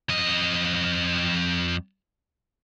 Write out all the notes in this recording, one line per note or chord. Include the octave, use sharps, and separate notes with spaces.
F2 D#5